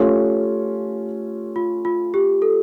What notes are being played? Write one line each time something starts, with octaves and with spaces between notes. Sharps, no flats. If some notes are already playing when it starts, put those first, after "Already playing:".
Already playing: A3 C#4 F4 G4
F4
F4
G4
A4